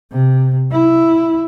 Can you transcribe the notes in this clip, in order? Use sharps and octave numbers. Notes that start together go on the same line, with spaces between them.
C3
E4